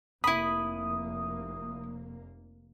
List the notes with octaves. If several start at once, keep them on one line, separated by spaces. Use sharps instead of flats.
F1 A#3 E4 B5 D#6